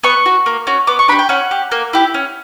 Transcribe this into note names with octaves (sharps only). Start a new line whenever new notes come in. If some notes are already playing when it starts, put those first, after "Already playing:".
B3 C#6
F#4
A#3
C#4 F#4
B3 D6
C#6
D4 G4 B5
G5
C#4 F#5
G4
A#3
E4 G4
C#4